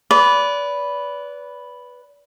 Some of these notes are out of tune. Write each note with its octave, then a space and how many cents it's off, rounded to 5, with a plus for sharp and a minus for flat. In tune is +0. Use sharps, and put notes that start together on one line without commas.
B4 +0 D5 -30